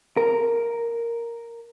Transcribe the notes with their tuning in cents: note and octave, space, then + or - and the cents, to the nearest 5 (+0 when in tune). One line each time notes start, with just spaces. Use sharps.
A#4 +0